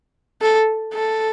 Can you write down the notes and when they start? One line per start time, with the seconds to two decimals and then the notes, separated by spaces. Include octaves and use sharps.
0.42 A4
0.93 A4